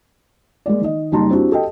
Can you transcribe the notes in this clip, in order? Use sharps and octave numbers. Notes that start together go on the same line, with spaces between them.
G#3 A#3 D5
D#3 D#5
F#1 G3 D#4 A5 A#5 C6
C4 D4 E4 F#4 G4
G4 A4 D#5 G5